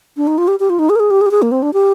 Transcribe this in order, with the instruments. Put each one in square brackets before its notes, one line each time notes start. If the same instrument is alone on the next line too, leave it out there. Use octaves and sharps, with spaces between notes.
[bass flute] D4
D#4
F4
G4
G4
F4
D#4
G#4
A#4
G#4
G4
G#4
G4
G#4
A#3
C4
D4
G4